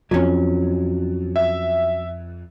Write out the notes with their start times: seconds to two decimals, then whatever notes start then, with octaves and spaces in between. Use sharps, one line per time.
0.11 F2 F#3 C#4
1.36 E5